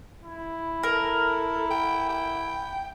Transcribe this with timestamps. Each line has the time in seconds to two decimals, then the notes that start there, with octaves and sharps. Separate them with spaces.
0.24 E4
0.83 A4 A#4
1.71 G5
2.09 G5